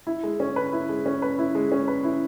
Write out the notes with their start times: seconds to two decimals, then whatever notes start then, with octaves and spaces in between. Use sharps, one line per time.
0.07 E4
0.23 G#3
0.40 C#4
0.56 B4
0.73 E4
0.89 G#3
1.06 C#4
1.22 B4
1.39 E4
1.55 G#3
1.72 C#4
1.88 B4
2.04 E4